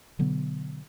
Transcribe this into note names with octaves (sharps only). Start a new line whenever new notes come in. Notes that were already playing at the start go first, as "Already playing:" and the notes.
B2 D3 F#3 B3